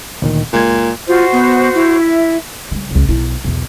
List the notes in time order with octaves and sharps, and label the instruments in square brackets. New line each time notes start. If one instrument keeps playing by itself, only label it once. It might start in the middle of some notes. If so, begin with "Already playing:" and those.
[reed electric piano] D2 A#2 D#3
[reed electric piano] C#2 G#3 G#6 [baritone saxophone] A#2
[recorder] F4 [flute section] F#4 C5
[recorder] B3
E4
[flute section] E5
[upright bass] D3 G3
C#2 C#3
B1 E4
B1 E2